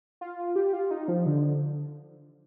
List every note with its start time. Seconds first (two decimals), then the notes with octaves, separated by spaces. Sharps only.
0.21 F4
0.56 G4
0.73 F4
0.91 D#4
1.08 F3
1.26 D3